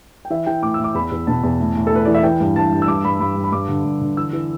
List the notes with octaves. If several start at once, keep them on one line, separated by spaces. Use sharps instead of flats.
G5
E3 E5
E3 G5
A2 D6
A2 E6
D6
E2 B5
E2
B2 A5
E2
A2
A2
A4
A2 B4
E3 D5
E5
E3 G5
G2
G2 A5
G2
E6
G2 D6
G2 B5
G2 B5
G2
B5
G2 D6
D3
G2
D3
E3 E6
E3